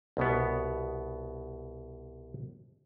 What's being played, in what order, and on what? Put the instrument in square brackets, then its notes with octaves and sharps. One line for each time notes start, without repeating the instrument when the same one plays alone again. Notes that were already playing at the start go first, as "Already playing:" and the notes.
[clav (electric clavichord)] C2 B2 B3